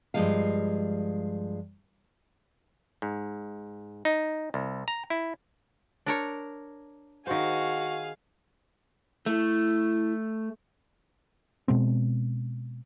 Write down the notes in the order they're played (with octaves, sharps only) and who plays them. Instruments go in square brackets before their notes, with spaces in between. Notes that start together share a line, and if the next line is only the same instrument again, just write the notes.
[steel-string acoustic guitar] G2 C#3 F3 G#3 F5
[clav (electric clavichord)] G#2
D#4
C2
A#5
E4
[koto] D4 A#4 C#5
[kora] D#3 C5 [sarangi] F#4 [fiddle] G#4 F5
[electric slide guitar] A3 [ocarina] E4
[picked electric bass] B2 G#3 C4